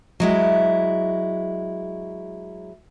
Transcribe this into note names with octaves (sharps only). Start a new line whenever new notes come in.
F#3 G#3 E4